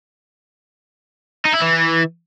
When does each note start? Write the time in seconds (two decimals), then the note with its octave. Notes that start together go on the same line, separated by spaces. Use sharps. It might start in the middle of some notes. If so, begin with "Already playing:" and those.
1.45 D#4
1.54 E4
1.62 E3